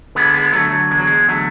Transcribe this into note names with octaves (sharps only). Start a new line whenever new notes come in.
D3 G#3 B3
G#3 B3
D3 F#3 A3
F#3
E2 G#3
F#3
G#3
D3 F#3 A3